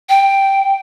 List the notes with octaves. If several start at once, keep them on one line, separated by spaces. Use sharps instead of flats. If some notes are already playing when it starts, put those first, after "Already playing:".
G5